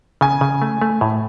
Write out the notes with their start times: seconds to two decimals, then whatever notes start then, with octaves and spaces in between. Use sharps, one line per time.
0.21 C#3 G#5
0.41 C#3
0.62 A3
0.82 A3
1.01 A2